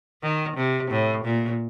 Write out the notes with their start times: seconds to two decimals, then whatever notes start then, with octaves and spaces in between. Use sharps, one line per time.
0.22 D#3
0.56 C3
0.90 A2
1.24 A#2